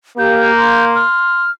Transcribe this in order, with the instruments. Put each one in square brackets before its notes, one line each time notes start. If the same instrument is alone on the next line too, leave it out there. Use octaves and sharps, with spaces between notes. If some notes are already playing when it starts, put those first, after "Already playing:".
[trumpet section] A#3 [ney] G4 [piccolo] G6
[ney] C6
[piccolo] F6